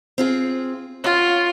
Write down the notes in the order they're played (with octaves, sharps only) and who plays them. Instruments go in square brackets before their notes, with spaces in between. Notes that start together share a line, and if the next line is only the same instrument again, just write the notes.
[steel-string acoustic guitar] C4 F4 G#4
[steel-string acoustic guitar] C#4 F#5 [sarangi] F4